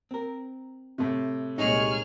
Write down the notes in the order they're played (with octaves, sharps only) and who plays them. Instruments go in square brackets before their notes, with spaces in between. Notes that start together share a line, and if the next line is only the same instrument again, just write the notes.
[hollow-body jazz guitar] C4 A#4
[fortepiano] A2 C3
[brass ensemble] C2 C#5 [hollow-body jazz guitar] A#2 G#3 D#4 [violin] G#4 F6